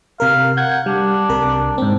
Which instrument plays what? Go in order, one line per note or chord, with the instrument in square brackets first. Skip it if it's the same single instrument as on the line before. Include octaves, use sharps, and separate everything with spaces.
[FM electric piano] C3 A#4 [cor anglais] F5
[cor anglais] F#5 [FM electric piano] G6 G#6
[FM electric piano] G3 [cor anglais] D4
[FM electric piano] C2 C3 A#4
G#2 C4